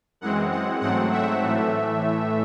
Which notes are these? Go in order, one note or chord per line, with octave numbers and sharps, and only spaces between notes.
F#2 E3 G#3 C4 F#5
F#5
G#2 F#3 A3 C4 F#5
E5
A2 E3 A3